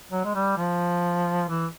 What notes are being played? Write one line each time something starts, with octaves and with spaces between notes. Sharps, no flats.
F#3
G#3
G3
F3
E3